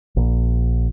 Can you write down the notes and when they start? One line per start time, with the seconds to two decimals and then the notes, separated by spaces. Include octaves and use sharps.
0.17 A#1